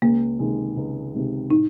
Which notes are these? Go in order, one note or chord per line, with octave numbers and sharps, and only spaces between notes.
C#2 A#3
C3 D#3 G#3
C#2
C3 D#3 G#3
A2 D#4